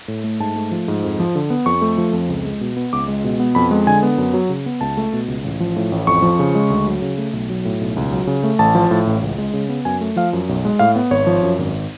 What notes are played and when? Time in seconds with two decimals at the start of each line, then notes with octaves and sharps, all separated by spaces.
0.08 A2
0.24 A3
0.40 G#2 A5
0.56 A3
0.71 F3
0.88 G#2
1.04 F2
1.20 F3
1.35 D3
1.50 B3
1.66 F2 C#6
1.82 A3
1.98 F3
2.13 F2
2.29 C#2
2.45 G#3
2.61 B2
2.77 B3
2.93 C#2 D6
3.08 G#3
3.24 B2
3.40 B3
3.55 F2 B5
3.71 G#3
3.87 D3 G#5
4.03 B3
4.18 F#2
4.34 F#3
4.49 C#3
4.66 B3
4.81 C#2 A5
4.97 A3
5.13 B2
5.28 C#2
5.44 A1
5.60 F3
5.76 A2
5.92 A1
6.07 F2 C#6
6.22 F3
6.39 C#3
6.55 G#3
6.70 D2
6.86 F#3
7.02 C#3
7.18 A3
7.33 B1
7.50 F#3
7.65 A2
7.81 B1
7.96 C#2
8.13 F#3
8.27 C#3
8.43 A3
8.59 A1 A5
8.75 F3
8.91 A2
9.07 A1
9.22 C#2
9.38 G#3
9.53 C#3
9.69 B3
9.85 F#2 G#5
10.01 A3
10.16 F3 F5
10.33 F#2
10.49 B1
10.65 G#3
10.79 A2 F5
10.96 B3
11.11 G#1 C#5
11.27 F3
11.43 F#2
11.59 G#1